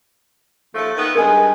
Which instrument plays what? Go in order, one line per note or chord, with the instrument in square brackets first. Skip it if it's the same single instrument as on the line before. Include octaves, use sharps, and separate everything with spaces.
[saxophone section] D#2 F3 A3
D#3 B3
[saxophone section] G2 G#3 [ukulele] A#4 G#5